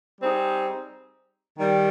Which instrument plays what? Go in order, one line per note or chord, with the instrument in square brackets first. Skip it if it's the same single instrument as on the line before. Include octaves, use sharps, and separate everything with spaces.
[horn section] G3 C4 D#4 G#4
D#3 G3